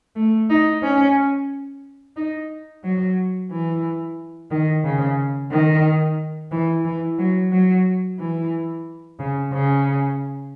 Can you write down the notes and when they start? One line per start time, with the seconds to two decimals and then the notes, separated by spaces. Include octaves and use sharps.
0.16 A3
0.50 D#4
0.83 C#4
2.16 D#4
2.84 F#3
3.51 E3
4.51 D#3
4.84 C#3
5.51 D#3
6.52 E3
6.85 E3
7.19 F#3
7.52 F#3
8.19 E3
9.19 C#3
9.53 C#3